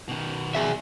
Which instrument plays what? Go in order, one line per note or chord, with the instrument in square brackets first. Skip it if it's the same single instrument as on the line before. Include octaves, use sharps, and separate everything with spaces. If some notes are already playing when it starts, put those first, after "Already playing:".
[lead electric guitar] B2 D#3
[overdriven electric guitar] G#4 E5